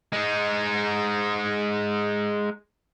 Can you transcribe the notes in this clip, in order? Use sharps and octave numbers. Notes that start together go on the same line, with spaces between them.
G#3 D#4